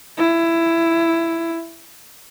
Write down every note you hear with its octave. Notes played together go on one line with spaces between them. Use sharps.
E4